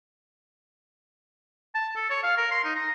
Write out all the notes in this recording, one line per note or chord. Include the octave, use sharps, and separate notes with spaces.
A5
A4
C#5
F5
A#4
C6
D#4
A#5